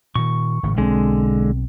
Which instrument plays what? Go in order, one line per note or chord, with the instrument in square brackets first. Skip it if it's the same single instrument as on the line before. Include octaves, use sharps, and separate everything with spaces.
[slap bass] A#2 D#3 [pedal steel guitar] C#6
[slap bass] G#1 A2 C#3
[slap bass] B1 E3 C4 [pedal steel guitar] D3 G#3